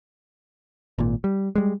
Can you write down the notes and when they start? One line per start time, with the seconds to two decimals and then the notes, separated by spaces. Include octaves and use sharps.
0.98 G#1 A#2
1.24 G3
1.56 G3 G#3